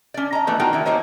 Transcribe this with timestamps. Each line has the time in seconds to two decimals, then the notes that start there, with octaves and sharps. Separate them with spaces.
0.14 C#4 D5
0.33 D#5 A#5
0.47 E3 A3 B3
0.59 D#4 F4 F#4 A#4 G5
0.73 D#3 E4
0.85 G3 A#3 C5 C#5 D#5